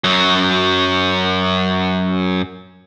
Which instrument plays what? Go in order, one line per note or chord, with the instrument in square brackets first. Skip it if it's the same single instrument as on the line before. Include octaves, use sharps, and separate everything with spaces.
[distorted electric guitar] F#2 F#3